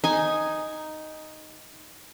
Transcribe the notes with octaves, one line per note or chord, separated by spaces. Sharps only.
D#4 G#5